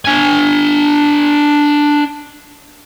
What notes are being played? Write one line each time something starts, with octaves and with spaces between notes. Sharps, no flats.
D4 G#5